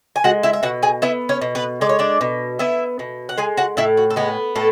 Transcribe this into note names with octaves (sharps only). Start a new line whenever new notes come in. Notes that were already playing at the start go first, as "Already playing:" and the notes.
G#5
G#3 F#4 F#5
E4 E5
E5
B2 F#4 F#5
G#4 G#5
B3 E4 E5
C#4 C#5
B2
B3 B4
G#3 D5
C#5
D4 D5
B2
B3 E4 E5
B2
F#5
G#3 G#4 G#5
F#4 F#5
A2 E4 E5
F#4
A4
G#3 B3 G#4
A2 A3 A4